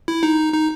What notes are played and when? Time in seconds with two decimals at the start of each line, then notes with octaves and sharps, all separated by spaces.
0.08 E4
0.23 D#4
0.53 D#4